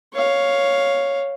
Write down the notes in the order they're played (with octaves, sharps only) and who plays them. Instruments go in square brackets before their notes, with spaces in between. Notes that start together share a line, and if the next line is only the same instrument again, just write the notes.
[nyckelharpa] C#5 F5